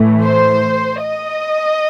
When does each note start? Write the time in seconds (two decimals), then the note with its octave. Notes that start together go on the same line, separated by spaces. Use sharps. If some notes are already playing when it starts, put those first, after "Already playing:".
Already playing: A2 E3 A3
0.22 C5
1.02 D#5